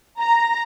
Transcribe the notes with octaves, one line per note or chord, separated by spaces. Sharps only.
A#5